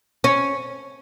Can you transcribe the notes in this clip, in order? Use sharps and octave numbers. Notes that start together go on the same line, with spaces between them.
C#4